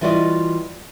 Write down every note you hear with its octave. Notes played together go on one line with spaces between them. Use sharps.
E3 G3 F4 F#4 D5 D#5